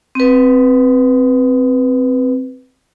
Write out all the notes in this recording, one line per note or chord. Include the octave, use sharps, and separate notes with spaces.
C4 B4